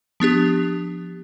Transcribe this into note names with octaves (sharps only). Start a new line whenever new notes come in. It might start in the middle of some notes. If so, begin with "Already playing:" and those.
F3 B3 D4 G4